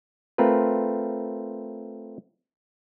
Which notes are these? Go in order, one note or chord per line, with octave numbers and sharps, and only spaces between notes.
A3 C4 F4 A#4 B4